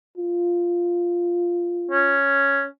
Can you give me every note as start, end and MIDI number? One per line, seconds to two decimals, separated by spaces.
0.18 2.18 65
1.92 2.65 61